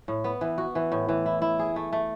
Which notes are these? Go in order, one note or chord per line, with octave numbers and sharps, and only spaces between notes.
A2
B3
E3
F#4
E3
A2
E3
E4
E4
G#4
A3
A3